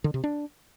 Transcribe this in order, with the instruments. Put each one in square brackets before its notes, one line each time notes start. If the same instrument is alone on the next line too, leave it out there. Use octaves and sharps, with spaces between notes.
[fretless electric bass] D3
C3
D4